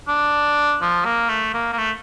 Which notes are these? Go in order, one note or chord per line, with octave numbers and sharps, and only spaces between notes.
D4
F3
A#3
A3
A#3
A#3
A3